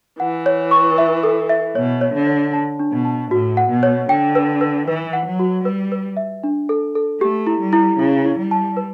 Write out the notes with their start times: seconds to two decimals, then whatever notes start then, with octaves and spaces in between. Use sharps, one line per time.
0.20 E3 F#5
0.46 C#5
0.71 C#6
0.98 E5
1.23 A4
1.49 E5
1.75 B2 C#5
2.01 C#5
2.14 D3
2.27 C#5
2.53 A5
2.79 D4
2.92 B2
3.05 A5
3.31 A2 F#4
3.57 F#5
3.70 B2
3.83 C#5
4.09 D3 G5
4.35 B4
4.61 B4
4.87 E3 B4
5.13 F#5
5.26 F#3
5.39 F#4
5.65 G3 B4
5.92 B4
6.17 E5
6.43 D4
6.69 A4
6.95 A4
7.21 A3 G4
7.47 E4
7.61 G3
7.73 E4
7.99 C#3 E4
8.25 E4
8.38 G3
8.51 A5
8.77 B4